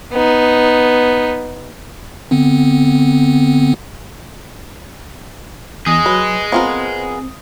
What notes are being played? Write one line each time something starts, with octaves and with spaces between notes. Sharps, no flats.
B3 D#4
D3 B3 C4
E2 G#4 D#5 D#6
F#3 B4
B3 C4 F4 A#4